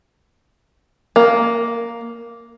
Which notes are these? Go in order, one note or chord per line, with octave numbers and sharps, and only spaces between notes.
A#3